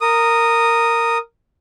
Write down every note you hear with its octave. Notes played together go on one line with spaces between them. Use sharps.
A#4 D#6